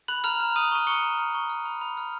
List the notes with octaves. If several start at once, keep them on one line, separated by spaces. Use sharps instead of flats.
B5 F#6 F#7
A#5 F6 F7
A#5
D#6 F6 D#7
C#6 D#7
A#5 C#6 C#7
A#5
F6
C#6
F6
B5
B5
F6